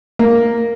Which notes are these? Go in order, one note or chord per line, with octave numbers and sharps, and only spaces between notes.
A#3